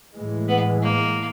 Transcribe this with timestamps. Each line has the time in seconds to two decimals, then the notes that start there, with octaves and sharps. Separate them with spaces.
0.14 A2 E3 G#3
0.48 B3
0.83 A#3